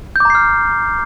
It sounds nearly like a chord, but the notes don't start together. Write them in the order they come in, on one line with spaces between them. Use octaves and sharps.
G6 D6 A#5 C7 F6